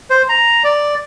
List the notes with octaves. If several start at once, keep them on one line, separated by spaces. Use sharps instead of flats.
C5
A#5
D5